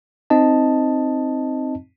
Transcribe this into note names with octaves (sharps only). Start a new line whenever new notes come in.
C4 D#4 D#5 A5